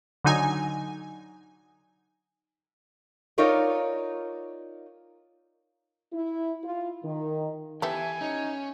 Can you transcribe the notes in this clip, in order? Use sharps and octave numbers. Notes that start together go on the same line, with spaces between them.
D3 F#3 D#4 G#5
D#4 F4 A#4 C#5 D5
E4
F4
D#3
E3 B3 G4 A4 E5 G#5
C#4 D#4